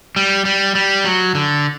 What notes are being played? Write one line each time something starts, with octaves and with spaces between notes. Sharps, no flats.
G3
G3
G3
F#3
D3